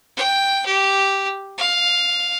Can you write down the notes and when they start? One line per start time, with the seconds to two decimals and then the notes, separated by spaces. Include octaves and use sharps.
0.17 G5
0.66 G4
1.58 F5